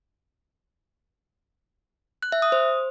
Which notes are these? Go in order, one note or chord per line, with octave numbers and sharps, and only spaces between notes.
F#6
E5
D#6
C5